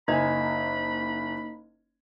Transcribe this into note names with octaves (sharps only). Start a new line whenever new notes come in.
F#1 A#3 D#4 D#5 G#5 B5